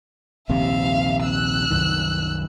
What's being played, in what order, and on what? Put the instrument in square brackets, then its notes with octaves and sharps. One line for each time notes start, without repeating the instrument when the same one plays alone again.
[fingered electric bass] A#1 D#2 C3 [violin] E5 F5
[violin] E6 F#6
[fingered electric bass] C2 F#2 D#3